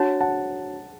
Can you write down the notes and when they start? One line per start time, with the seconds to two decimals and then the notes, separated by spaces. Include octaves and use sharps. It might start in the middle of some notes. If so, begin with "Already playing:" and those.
Already playing: D4 F#4 C#5 F#5 A5
0.21 F#5 A5